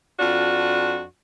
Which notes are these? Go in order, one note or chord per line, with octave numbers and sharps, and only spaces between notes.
F2 D4 F4 F#4